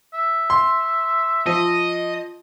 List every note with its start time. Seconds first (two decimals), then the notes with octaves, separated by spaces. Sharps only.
0.14 E5
0.50 C6
1.46 F3 D#5